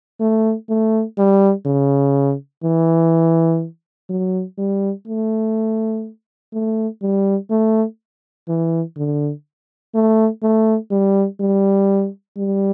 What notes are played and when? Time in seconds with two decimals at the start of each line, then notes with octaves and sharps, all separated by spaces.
0.20 A3
0.69 A3
1.18 G3
1.66 C#3
2.64 E3
4.10 F#3
4.58 G3
5.07 A3
6.54 A3
7.02 G3
7.50 A3
8.48 E3
8.97 D3
9.95 A3
10.43 A3
10.91 G3
11.40 G3
12.37 G3